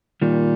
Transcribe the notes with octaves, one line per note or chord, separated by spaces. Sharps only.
A#2 D#3 G3